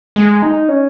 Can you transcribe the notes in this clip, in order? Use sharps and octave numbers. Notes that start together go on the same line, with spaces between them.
G#3
D#4
C#4